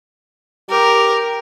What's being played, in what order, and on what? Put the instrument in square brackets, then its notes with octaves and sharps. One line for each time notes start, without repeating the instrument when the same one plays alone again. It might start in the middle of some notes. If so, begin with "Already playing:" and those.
[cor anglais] G4 [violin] A#4